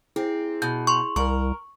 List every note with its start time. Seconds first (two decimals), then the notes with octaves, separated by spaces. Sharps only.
0.16 C4 E4 G#4
0.62 B2 G6
0.87 C6 C#6
1.16 C2 A#4 C#6